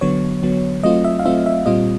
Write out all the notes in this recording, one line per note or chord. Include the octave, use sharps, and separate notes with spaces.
D3 F#3 B3 C#5
D3 F#3 B3
F#3 A3 C4 F4 D#5
E5
F5
F#3 A3 C4 F4 E5
E5
A#2 G3 C4 F4 D#5